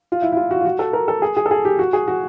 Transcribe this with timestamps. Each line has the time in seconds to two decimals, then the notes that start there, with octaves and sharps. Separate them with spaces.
0.12 F4
0.22 E4
0.32 E4
0.37 F4
0.51 F#4
0.60 F4
0.65 F#4
0.79 A4
0.93 A#4
1.08 A4
1.22 G#4
1.37 G#4
1.46 A4
1.51 G#4
1.65 G4
1.79 F#4
1.93 G#4
2.08 F#4